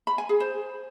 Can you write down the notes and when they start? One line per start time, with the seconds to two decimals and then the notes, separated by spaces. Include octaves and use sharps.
0.07 B5
0.18 G#5
0.29 G#4
0.40 C5